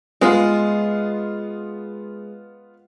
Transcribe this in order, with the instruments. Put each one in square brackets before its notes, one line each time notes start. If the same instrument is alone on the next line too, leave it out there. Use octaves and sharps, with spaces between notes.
[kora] G#3 [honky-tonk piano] B3 F4